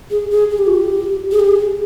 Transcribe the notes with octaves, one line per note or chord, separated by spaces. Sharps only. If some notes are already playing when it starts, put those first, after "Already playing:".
G#4
G#4
G#4
G4
F4
G4
G#4
G4
G#4